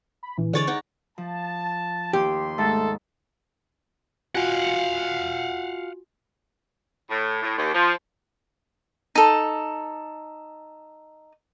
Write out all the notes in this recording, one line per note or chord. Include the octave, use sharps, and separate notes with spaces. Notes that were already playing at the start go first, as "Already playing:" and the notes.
B5
A#1 E3
D3 G#3 C#5 D5 A6
D#4 C#5 F#5
F3 A5
D#2 G4 C6 G6
G#2 A3 A4
F4 F#4 F5 F#5 G#5
A2
A2
D#2
F3
D#4 A4